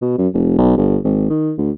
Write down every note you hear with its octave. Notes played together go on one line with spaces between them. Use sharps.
B2
F#2
F1
B1
G1
G#1
D#3
D2